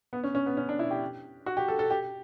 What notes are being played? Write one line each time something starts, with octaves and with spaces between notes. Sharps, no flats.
B3
C#4
C#4
B3
C#4
D4
E4
G4
F#4
G4
A4
A4
G4